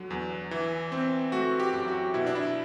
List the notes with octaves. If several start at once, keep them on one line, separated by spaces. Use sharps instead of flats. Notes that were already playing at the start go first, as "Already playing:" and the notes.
Already playing: D3 F#3
E2
E3
C4
A3 F#4
G4
F#2
F#4
B2 E4
D4
E4